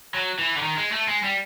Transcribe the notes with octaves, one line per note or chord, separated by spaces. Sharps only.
F#3
E3
D3
D#3
G#3
A3
G#3
G3